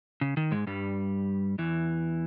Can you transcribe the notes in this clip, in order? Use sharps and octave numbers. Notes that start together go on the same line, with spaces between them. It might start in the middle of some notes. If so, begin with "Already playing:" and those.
C#3
D#3
G#2 G#3
G2 G3
E2 E3